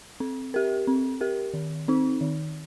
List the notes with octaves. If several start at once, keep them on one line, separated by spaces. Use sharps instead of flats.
C4
G4 A#4
C4
G4 A#4
D#3
C4 D#4
D#3